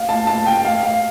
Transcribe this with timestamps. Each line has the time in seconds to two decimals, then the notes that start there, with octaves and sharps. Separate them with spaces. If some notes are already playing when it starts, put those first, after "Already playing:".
Already playing: F5
0.09 A5
0.27 A5
0.46 G5
0.65 F5
0.83 F5